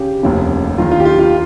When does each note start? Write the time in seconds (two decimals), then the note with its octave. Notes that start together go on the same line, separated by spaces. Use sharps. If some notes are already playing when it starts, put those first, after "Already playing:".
Already playing: C#3 G4
0.23 F1 D#2 C#3
0.78 D#2 D#3 F4
0.91 F4
1.00 G4
1.05 F4
1.19 F4